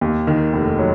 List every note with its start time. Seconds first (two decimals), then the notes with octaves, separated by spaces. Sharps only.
0.01 D#2
0.27 D#3
0.53 F1
0.79 F#3